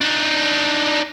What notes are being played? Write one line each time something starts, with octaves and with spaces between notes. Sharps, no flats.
D4 D#4